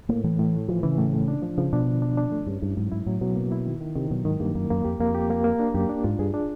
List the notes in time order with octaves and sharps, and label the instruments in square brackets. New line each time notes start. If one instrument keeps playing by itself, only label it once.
[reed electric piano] A2 [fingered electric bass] A#3
[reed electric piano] A2 [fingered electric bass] E3
[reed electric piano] A2
A3
[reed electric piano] E3 [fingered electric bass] F3
[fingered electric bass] C#3 [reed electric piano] E3
[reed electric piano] A2
A2
D4
F3
[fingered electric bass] C#3 [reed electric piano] F3
[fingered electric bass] B2 [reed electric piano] D4
[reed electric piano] D3
D4
D4
A3
[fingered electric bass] G2 [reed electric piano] C#4
[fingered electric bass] G2 [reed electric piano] E4
[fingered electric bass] G#2 [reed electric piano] F#3
[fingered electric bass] G#2 [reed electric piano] E4
[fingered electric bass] A2 [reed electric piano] F#3
[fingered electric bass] B2 [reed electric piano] F#3
[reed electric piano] A#3
E4
D#3
D#3
[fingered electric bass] C3 [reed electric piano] D#3
[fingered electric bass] B2 [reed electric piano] F#3
[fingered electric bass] G#2 [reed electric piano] D#3
[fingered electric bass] G2 [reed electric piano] A#3
[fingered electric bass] F#2 [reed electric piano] A#3
[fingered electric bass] F#2 [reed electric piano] A#3
[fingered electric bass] F2 [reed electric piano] G4
[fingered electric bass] F2 [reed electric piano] A#3
[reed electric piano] G4
A#3
A#3
D4
[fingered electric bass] F#2 [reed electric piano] G4
[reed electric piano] D4
[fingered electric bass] G#2 [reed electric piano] F4
[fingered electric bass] G2 [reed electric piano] G#4
[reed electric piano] D4